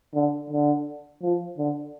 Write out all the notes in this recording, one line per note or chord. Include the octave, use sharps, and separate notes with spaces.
D3
D3
F3
D3